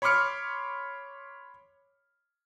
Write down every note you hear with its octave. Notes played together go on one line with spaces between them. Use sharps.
C#5 B5 C6 D6 F6 C#7